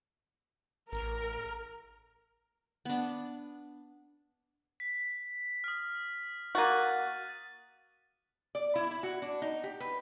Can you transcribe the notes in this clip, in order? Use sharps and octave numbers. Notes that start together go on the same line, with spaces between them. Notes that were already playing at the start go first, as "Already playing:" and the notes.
A1 A#4
B3 D4
B6
D#6 F6
A#3 F#4 F#6 A6 D#7
D5
E4
E4
F#4
D4
D#4
G4
B4